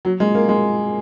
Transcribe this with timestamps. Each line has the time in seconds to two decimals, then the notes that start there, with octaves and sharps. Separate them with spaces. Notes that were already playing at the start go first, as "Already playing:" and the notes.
0.05 F#3
0.20 G#3
0.35 A#3
0.49 G#3